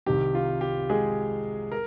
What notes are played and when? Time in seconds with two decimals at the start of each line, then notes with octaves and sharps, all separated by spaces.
0.06 C2 C3 D#3 G4
0.35 F4
0.61 G4
0.89 G#3 G#4
1.72 A#4